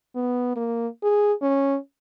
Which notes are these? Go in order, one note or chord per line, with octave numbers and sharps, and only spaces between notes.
B3
A#3
G#4
C#4